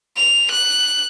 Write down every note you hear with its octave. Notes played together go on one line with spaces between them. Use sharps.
F7
F#6